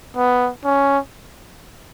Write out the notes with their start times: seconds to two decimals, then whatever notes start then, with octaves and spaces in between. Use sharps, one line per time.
0.16 B3
0.64 C#4